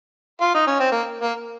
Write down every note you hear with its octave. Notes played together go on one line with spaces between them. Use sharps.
F4
D#4
C#4
C4
A#3
A#3